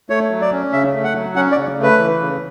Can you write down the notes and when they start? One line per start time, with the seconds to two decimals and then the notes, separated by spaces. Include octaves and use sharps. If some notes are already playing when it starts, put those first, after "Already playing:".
0.10 A3 C#5
0.31 F#3
0.41 D5
0.52 C#4
0.73 C#3 E5
0.93 A3
1.04 F#5
1.15 F#3
1.36 C#4 F#5
1.52 D5
1.57 C#3
1.78 A3
1.83 B4
1.98 E3
2.20 C#3